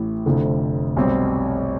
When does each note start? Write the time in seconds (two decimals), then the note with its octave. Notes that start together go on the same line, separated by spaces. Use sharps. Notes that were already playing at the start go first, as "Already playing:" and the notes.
Already playing: A1 A2 E3
0.26 F1 F2 D3
0.97 B1 B2 G3 C4